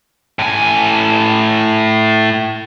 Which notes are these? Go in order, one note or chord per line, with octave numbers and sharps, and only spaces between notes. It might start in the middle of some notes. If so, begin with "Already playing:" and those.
A2 G#5